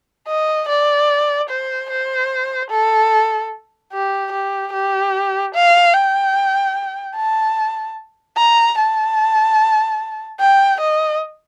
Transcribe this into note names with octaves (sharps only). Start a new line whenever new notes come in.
D#5
D5
C5
C5
A4
G4
G4
G4
F5
G5
A5
A#5
A5
G5
D#5